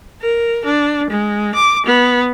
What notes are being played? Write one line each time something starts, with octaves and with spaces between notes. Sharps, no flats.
A#4
D4
G#3
D6
B3